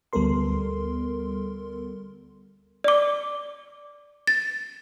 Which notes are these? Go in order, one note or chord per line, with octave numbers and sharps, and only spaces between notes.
D2 G3 B3 A4 A#4 C6
D5 D6
A6